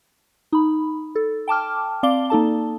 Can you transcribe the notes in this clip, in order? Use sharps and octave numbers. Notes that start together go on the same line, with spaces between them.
D#4 B5
A4
G5 A5 D6 F6
C4 D5 F5 D6 G7
A#3 D#4 A4 A5